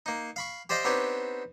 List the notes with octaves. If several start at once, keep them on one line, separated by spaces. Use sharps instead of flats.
A#3 D#4
F5 B5 C#6
G4 C5 D5 D#5 F5 G5
B3 C4 D4 D#4 G4 C#5